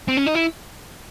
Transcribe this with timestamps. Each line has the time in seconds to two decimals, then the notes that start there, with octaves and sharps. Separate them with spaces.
0.08 C4
0.17 C#4
0.26 D#4
0.35 E4